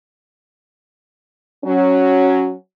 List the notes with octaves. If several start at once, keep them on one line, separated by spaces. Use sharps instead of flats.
F#3 C#4